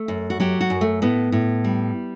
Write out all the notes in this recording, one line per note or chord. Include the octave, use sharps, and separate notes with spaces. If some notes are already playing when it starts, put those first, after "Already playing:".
Already playing: A3
F#2
F#4
F#3 G4
F#4
F#2
A3
A2 B3
A2
G3